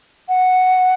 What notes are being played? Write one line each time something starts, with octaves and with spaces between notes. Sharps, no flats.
F#5